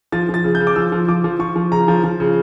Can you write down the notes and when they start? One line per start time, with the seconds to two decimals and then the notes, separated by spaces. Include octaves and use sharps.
0.12 F3 A6
0.29 F3 A6
0.44 C#3
0.55 G6
0.60 C#3
0.67 D6
0.76 F3 E6
0.92 F3
1.08 F3 D6
1.24 F3
1.39 F3 C#6
1.56 F3
1.72 C#3 A#5
1.88 F3
2.04 F3
2.20 C#3